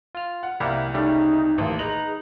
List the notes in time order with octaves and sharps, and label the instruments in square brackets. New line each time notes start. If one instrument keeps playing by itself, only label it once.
[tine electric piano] F4 F6
[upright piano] F#5
[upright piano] C2 [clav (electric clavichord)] G3 A#3 E4 [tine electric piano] F#5
[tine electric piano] C#3 [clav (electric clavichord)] G3 A3 [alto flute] D#4
[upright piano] A1 A5 [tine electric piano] D#2 A#3
[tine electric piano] D#4 B4 A#5 [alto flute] G#4 [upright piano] F#7